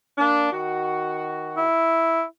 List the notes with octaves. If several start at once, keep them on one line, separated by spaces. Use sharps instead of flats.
A#3 D4
D#3 F#4
E4